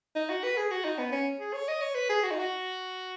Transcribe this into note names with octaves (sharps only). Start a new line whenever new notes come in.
D#4
F#4
B4
G#4
F#4
D#4
B3
C#4
G#4
C#5
D#5
C#5
B4
G#4
F#4
D#4
F#4